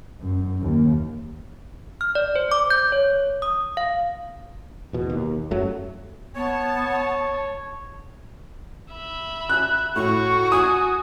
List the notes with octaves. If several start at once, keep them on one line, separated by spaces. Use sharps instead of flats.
F#2
D#2
F6
D5
C5
D6
G6
C#5
D#6
F5
E2 B2
D#2
F#2 F#3 A3
B3 C#5 A5
E5 B5
F#6
A2 F#4 C#6
G#5 D#6